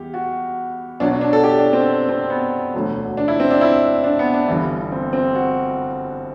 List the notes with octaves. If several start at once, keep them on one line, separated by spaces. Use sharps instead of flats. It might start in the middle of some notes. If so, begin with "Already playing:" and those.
Already playing: E2 G3 G4
F#4
B1 B2 F#3 D4
D4
D4
A4
G4
D4
C4
C4
B3
E1 D2 D3 F#3
D4
E4
C4
D4
E4
D4
B3
D4
G1 G2 E3
C4
C4
F#4